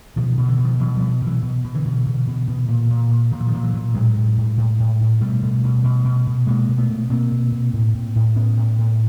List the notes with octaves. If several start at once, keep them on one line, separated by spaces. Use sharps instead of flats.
B2 D#3 F3
D#3
B2
D3 E3
B2
D#3 F3
B2 E3 F#3
B2 F3 G3
B2 E3 F#3
B2
B2
D3 E3
B2
B2
B2
B2
A#2
A#2
A#2
A#2 D#3
E3
D#3 F3
A#2
E3 F#3
A#2
A2 F#3 G#3
A2
A2
A2
A2
A2
B2 G3 A3
B2
B2
B2
B2
B2
B2 G#3 A#3
B2
A3 B3
B2
B2 A#3 C4
B2
B2
A2
A2
A2
A2 B3 C#4
A2
A2